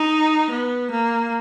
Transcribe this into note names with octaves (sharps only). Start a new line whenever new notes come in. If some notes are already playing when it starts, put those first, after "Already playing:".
Already playing: D#4
B3
A#3